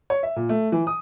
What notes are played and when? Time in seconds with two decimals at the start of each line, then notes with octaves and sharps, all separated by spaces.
0.10 C#5
0.23 E5
0.36 A#2
0.49 A3
0.72 E3
0.87 D#6